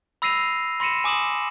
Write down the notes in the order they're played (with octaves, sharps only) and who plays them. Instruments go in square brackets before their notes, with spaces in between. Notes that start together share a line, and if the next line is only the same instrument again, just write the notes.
[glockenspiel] B5 E6 A#6 C7 D#7 F7
B5 C6 A#6 C#7 D#7 E7
G#5 D6 D#6 E7 F#7